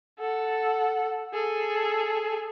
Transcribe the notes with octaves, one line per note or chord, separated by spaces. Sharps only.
A4 F#5
G#4 A4